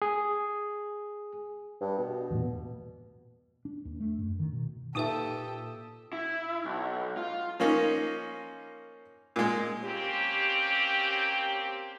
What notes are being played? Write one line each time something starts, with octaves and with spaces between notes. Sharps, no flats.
G#4
G2
B2
E2 G2 A#2
D4
D#2
A3
F#2
D#3
B2
A#2 D#4 G4 A4 B4 E5 D#6 E6
E4
B1
F4
F3 A#3 C#4 D#4
A#2 G#3
A#3 C4 C#4 G4